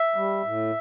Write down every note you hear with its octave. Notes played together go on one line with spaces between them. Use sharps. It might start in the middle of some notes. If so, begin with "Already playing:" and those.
Already playing: E5
G3
A2